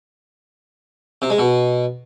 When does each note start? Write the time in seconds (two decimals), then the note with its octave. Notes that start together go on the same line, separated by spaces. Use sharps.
1.22 C3
1.30 G#3
1.39 B2